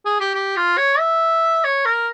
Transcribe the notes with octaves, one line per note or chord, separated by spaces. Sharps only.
G#4
G4
G4
F4
C#5
E5
C#5
A#4